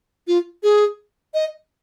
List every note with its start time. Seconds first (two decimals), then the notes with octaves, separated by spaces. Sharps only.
0.28 F4
0.63 G#4
1.34 D#5